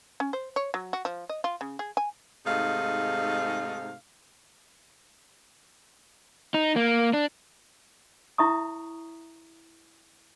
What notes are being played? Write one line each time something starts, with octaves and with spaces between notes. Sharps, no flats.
C#4
C5
C#5
F#3
F#4
F3
D#5
F4
C#3
G#4
G#5
G#2 C3 A3 D#4 G#4 F5
D#4
A#3
D4
E4 C#5 E5 A#5 C#6 D#6